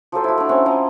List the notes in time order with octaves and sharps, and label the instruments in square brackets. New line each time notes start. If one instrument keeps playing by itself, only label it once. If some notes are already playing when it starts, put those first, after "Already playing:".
[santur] F3 F#3 A4 C5
E4 F#4
A3 D4
C4 C#4 F#5 A#5
F3 D#5 A#5